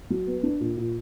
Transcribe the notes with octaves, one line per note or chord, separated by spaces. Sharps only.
F#3
B3
D4
A#2
A#2